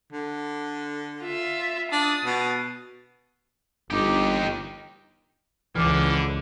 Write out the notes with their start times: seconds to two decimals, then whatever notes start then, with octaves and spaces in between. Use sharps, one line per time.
0.12 D3
1.23 F4 E5
1.92 D4 D#6 A6
2.25 B2
3.91 G1 D#4 G4
5.75 C#2 D3 E3 D6 F6